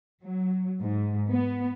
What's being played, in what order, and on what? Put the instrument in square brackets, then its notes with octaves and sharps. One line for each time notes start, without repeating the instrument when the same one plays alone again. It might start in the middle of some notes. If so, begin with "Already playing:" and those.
[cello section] F#3
G#2
B3